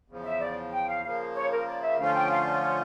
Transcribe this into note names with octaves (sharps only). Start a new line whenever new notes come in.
E2 C#3 F3
E5
D5
G5
F5
C#3 F3 A#3 F5
C#5
A#4
D5
E5
D3 F3 A3 C#4 F4 F5
G5
F5
D5
C#5